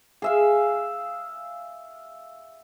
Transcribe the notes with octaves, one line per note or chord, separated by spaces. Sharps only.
G#4 E5 F5